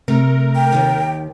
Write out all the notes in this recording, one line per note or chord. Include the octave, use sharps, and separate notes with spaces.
C3 A3 A#4
G5
D#2 D#3